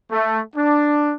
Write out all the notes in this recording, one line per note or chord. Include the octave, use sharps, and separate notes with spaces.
A3
D4